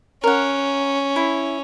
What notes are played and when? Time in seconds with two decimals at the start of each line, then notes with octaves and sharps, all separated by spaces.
0.24 C#4 A#4 F#5
1.16 E4